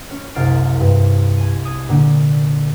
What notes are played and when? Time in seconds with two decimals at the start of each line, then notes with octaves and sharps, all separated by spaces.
0.11 C#4
0.35 F#1 C2 F5 A6 C7 D7
0.80 G2
1.37 G#5 D#7
1.64 D#6 G#6
1.89 A#2 D3